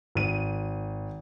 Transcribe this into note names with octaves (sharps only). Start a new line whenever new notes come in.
G#1 D#7